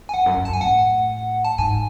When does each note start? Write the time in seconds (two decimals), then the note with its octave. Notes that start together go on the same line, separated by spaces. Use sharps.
0.09 G#5
0.14 E2 F#5
0.26 F#2
0.37 F#2
0.45 A5
0.49 F#2 G#5
0.61 A2 F#5
1.45 A5
1.58 G#2 G#5